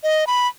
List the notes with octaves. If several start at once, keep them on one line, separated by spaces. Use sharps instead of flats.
D#5
B5